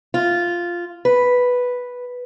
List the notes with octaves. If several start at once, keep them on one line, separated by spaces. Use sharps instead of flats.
F4
B4